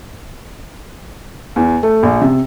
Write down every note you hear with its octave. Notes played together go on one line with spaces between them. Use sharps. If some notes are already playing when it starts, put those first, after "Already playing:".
E2
A3
A#1
C3